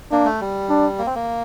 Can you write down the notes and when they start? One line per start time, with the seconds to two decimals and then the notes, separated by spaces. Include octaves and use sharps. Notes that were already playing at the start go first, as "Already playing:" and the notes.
0.11 A#3 D4
0.25 A3
0.41 G3
0.69 D4
0.98 A#3
1.07 C4
1.15 A#3